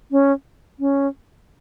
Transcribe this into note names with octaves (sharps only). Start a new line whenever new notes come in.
C#4
C#4